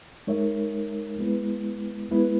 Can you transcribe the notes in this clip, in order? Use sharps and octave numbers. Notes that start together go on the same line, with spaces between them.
G#3 D#4 A#4 C#5 E5
G#3 B3 E4 B4
G#3 B3 E4 B4